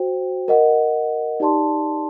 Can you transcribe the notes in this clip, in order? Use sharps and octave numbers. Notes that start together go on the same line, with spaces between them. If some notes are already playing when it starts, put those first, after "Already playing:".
Already playing: F#4 C5 G5
A#4 D#5 F#5
D#4 G4 D5 A5 C6